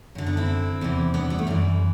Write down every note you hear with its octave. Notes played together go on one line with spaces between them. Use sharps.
F#2 D3
B3 D4
C4 E4
E2 C3 E3
B3 D4
G3 B3
A3
F#2 E3 G3